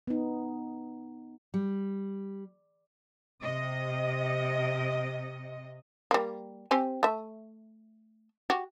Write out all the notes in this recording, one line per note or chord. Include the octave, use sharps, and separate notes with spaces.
B3 D#4
G3
C3 D#5
G3 A#3
C4 G4 G#5
A3 E5
F#4 G4